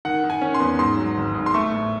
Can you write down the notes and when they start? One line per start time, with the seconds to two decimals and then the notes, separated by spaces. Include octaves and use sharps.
0.05 D#3 F#5
0.24 D#3
0.30 G#5
0.41 C#4
0.54 C6
0.60 E2
0.79 G#2 C6
0.97 F#3
1.17 G#1
1.34 G#2
1.46 C6
1.54 A3 C#6
1.72 A2